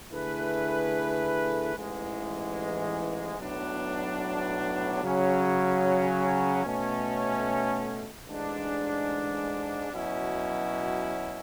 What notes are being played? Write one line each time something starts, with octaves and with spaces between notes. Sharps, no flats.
D3 A3 E4 G#4 B4
A1 G#2 E3 G#3
B1 A2 F#3 B3 D4
C#3 F#3 C#4
B2 A3 C#4
A1 G#2 G#3 D4
B2 F#3 C#4 E4